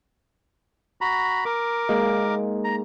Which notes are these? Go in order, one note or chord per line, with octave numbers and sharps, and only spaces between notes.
F#4 A#5 B5
A#4 D6
G#3 A#3 D#4
A#5